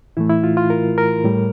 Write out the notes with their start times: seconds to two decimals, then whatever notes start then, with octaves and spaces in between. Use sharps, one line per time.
0.17 A2 E3 A3 E4
0.30 E4
0.44 F4
0.57 F4
0.70 A#4
0.98 A#4
1.24 A2 G3